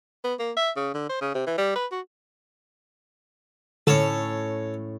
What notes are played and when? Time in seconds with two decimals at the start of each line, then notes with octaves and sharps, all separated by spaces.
0.24 B3
0.39 A#3
0.57 E5
0.76 C#3
0.94 D3
1.09 C5
1.21 C#3
1.35 C3
1.47 E3
1.58 G3
1.75 B4
1.92 F#4
3.87 A2 D3 C#4 A4 C#5 E7